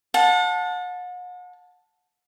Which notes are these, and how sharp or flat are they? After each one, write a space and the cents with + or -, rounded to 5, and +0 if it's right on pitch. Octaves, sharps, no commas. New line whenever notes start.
F#5 -40 A5 +0